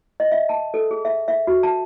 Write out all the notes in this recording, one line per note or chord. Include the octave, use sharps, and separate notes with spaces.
D#5
E5
A5
A4
G#4
E5
E5
F#4
A5